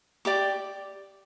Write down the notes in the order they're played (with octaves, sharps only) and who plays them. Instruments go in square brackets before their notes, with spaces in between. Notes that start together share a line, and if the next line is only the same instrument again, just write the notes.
[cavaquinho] G4 D5 D6